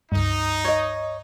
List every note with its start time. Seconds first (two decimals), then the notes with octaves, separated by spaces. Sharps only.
0.12 C#2 G2 D#4
0.65 C#5 D#5